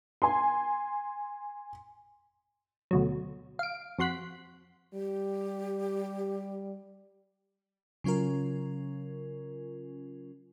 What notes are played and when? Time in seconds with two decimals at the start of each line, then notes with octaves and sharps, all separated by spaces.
0.22 G#5 C6
2.91 D2 B2 F#3
3.59 F5 D7
3.99 F2 F#4 C6 F#6 B6
4.93 G3 G4
8.04 C#3 F#3 C#4 F4 A#4